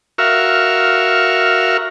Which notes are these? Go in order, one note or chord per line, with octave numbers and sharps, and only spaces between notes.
F#4 A#4 E5 F5 C#6